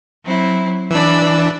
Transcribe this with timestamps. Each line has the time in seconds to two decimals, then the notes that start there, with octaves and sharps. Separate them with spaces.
0.23 F#3 C4 E4
0.91 E3 D4 D5 B5 E6